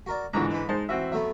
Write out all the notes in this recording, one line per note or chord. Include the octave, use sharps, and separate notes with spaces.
F#4 A#4 D5
C#2 G#2 D3 E3 C#5 A#5
G#3 B4
G#3 D#4 C5 A5
E3 C4 F#4 E5
F#3 A3 B3 E5